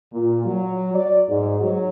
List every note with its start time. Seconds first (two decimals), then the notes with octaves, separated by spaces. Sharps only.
0.13 A#2
0.45 F#3
0.95 D5
1.28 G#2
1.60 F#3